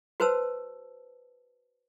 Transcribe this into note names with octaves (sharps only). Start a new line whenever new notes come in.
F#4 B4 C5 A5 E6